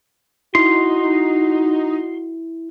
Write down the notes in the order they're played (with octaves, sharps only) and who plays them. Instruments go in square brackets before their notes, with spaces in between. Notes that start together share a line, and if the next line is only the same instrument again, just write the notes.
[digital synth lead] D#4 [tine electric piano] E4 [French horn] F#4 [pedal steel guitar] C6